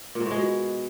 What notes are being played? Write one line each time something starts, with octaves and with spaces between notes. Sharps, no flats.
A#2
G#2
A2
G#3
B2